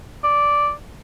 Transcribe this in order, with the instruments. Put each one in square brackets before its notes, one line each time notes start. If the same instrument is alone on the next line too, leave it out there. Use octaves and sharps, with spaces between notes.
[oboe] D5